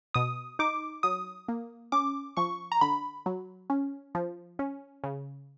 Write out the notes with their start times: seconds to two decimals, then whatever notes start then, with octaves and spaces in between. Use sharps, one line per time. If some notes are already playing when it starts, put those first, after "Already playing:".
0.14 B2 D#6
0.59 D#4 D6
1.03 F#3 D#6
1.48 A#3
1.92 C#4 D6
2.37 F3 C#6
2.72 A#5
2.81 D3 B5
3.26 F#3
3.70 C#4
4.15 F3
4.59 C#4
5.04 C#3